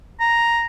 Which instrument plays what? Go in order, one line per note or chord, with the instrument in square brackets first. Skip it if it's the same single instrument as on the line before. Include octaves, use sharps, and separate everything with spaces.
[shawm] A#5